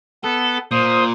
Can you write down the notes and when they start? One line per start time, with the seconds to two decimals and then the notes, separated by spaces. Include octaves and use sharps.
0.24 B3 A4
0.71 A#2 C5 D#6